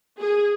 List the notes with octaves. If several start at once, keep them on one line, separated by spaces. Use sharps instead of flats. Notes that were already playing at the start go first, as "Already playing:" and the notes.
G#4